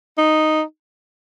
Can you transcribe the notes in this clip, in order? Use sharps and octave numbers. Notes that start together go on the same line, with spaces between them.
D#4